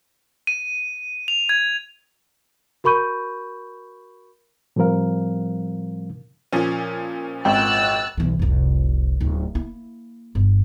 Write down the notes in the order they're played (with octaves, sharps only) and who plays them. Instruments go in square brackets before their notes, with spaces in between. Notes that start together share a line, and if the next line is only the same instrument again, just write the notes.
[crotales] D#7
F7
G#6
[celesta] F#4 A#4 B5 C#6 G6 D#7
[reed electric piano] A2 F3 G3 C4 A#4 F5
[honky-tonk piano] A#2 F3 C#4
[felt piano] G#1 G5 [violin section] E6 F#6 A6
[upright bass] B1 E3
F1 C2
D1 D#4
A#3 E4
G1